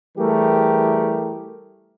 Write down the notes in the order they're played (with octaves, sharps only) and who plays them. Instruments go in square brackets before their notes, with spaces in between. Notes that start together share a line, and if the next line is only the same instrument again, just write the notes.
[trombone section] E3 G3 A3 G4 G#4 A#4